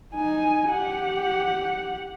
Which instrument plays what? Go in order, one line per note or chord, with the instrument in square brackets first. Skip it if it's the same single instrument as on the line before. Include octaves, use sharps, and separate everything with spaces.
[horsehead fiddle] D#4 G#5
G4 F#5